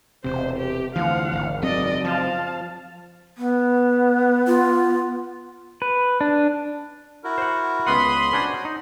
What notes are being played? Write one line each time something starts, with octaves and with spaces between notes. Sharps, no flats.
E1 C3 C5
G4
F1 D2 E3 F3 F5 F#5
G#1
F#1 F#3 C4 D5 D#5
F3 F5 A5
B3
F4
B4
D4
E4 F#4 A#4
C5 F#5
C#2 B3 F#5 B5 C6 D#6
C#4 D4 F#4 C5 C#5
D#4